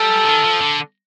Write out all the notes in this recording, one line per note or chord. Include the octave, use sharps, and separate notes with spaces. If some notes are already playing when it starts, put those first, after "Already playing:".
Already playing: G3 A4
D#3
F3
D3